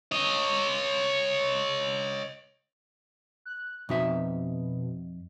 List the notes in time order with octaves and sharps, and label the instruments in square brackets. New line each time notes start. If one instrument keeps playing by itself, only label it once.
[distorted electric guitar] C#5 D#5
[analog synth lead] F#6
[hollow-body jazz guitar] F2 D#4 E5 [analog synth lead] B2